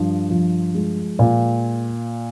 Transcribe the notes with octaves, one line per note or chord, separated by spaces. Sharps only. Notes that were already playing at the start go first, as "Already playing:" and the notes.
Already playing: G2 F3
F3
G#3
A#2